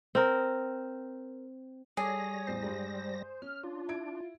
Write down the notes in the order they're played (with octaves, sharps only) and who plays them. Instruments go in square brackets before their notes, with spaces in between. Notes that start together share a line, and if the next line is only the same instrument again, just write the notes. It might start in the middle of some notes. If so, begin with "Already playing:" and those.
[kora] C4 A#4
[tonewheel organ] G3 A#6 [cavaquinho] G#4 [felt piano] A4 D6 [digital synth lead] C#5
[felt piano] A1 E2 C7 [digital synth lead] C5
[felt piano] G2 G#3
[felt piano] C#4 [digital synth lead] F6
[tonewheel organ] D4 [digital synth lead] F4
[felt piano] E4 G#6 D7